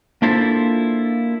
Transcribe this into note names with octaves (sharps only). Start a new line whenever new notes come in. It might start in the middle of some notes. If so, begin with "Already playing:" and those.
A#3 D4 E4 F4 A4 C5